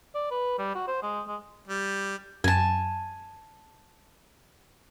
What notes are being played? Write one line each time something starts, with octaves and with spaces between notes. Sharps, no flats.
D5
B4
G3
F#4
C5
G#3
G#3
G3
F#2 G#5 A5